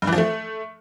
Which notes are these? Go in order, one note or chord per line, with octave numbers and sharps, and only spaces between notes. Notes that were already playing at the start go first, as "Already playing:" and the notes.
G2
E3
F3
A3